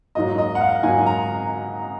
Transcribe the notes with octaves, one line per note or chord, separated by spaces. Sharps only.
G#2 F#3 A#3 D#5
D#5
F#5
F5
G#2 F#3 A#3 G#5
A#5